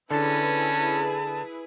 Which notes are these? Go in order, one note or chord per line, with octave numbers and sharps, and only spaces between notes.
D3 C#4 E4 G#4 B4 A5